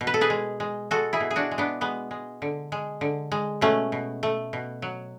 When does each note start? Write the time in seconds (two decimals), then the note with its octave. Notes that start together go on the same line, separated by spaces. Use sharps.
0.01 B2
0.07 B4
0.14 A4
0.21 G#4 B4
0.30 G#3
0.60 G#3
0.91 G#3 F#4 A4
1.13 E4 G#4
1.20 B2
1.31 G#4
1.36 D4 F#4
1.51 G#3
1.58 B3 D4
1.81 G#3 B3
2.11 G#3
2.42 D3
2.72 G#3
3.01 D3
3.32 G#3
3.61 B2 A3 C#4
3.92 B2
4.23 A3
4.53 B2
4.82 F#3